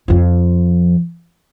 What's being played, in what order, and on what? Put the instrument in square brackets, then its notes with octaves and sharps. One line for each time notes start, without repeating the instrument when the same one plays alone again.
[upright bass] F2 F3